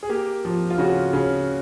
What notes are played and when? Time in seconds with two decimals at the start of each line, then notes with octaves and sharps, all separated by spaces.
0.03 G#4
0.09 A#3 G4
0.45 F3
0.70 F4
0.78 C#3 F#4
1.13 C#3